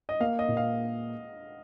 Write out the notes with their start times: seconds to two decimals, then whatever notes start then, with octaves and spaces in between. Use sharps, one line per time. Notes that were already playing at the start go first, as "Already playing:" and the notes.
0.09 D#5
0.20 A#3 F5
0.39 D#5
0.48 A#2
0.57 F5